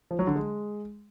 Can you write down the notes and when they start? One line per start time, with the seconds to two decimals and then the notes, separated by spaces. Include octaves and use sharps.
0.11 F3
0.19 F#3
0.27 D3
0.35 G#3